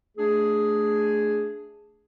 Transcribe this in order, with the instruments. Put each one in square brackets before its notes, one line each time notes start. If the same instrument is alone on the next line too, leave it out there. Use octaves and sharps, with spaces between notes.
[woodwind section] A3 D4 G#4